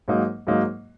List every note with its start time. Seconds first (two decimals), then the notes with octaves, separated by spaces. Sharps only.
0.08 G#2 F#3 A#3 D#4
0.47 G#2 F#3 A#3 D#4